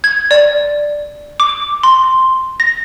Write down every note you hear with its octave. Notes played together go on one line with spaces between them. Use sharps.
G#6
D5
D6
C6
A#6